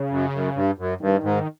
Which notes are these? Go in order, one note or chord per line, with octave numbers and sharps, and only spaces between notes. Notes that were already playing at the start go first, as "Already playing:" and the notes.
Already playing: C#3
F#2
F#2
G2
F#2
G2 D#3
G#2